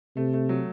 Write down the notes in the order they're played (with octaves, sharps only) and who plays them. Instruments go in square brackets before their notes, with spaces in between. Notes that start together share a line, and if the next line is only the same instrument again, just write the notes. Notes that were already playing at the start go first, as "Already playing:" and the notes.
[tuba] C3 [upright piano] A3
[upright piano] A3
F#3